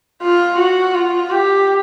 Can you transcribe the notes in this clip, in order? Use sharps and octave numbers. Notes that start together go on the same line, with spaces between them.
F4
F#4
F4
G4